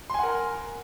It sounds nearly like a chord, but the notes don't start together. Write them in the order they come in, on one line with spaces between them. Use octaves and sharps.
C6 G#5 F#5 A#4 A#5